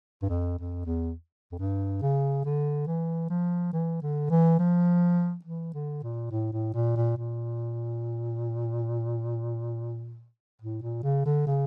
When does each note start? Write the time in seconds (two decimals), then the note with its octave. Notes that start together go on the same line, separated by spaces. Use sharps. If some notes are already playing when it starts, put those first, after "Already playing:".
0.22 G2
0.29 F2
0.59 F2
0.86 E2
1.52 F2
1.59 G2
2.02 C#3
2.45 D3
2.87 E3
3.30 F3
3.73 E3
4.02 D3
4.30 E3
4.59 F3
5.45 E3
5.74 D3
6.03 A#2
6.31 A2
6.53 A2
6.74 A#2
6.96 A#2
7.17 A#2
10.61 A2
10.82 A#2
11.03 C#3
11.25 D3
11.47 C#3